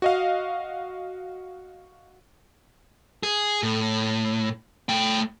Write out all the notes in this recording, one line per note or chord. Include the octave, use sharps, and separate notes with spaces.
F#4 D#5 F5
G#4
A2
A3 G5